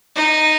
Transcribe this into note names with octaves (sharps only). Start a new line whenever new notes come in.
D#4